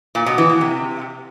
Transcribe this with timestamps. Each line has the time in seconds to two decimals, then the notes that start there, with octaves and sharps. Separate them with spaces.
0.15 A#2
0.26 B2
0.38 E3
0.49 B2
0.61 C3